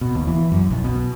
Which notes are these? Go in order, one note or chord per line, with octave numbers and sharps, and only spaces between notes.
B2
D#2
E3
F#2
B1
B2